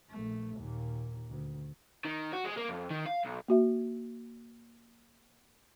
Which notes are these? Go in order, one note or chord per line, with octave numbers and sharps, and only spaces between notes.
A#1 A3
D#2 A#2
D2
D#3
F#4
G#3
A#3
F2
D#3
F5
B1
A#3 F#4 E5